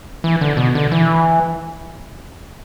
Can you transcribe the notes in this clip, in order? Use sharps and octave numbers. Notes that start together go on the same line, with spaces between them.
E3
D3
B2
D3
E3